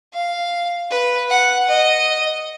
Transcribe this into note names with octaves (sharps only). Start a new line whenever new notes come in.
F5
B4
F#5
D#5